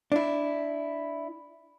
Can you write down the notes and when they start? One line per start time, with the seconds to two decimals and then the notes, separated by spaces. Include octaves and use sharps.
0.12 D4 E4